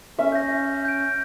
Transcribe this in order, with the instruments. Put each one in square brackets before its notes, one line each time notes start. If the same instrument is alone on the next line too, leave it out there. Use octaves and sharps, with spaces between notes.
[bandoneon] C#4 [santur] E5
[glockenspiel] G6 A#6
G6 D7